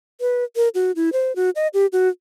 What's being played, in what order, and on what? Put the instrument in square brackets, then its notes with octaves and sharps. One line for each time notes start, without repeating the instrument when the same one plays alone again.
[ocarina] B4
A#4
F#4
E4
C5
F#4
D#5
G4
F#4